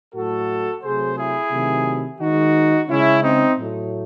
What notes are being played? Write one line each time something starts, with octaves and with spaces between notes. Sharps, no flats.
A2 F#3 A3 F#4 A4
C3 F#3 A3 G#4 C5
E4 G#4
C3 D#3 F#3 A3
D#3 G#3 D#4 F#4
C#3 G#3 C#4 E4
C4 D#4
A2 F#3 A3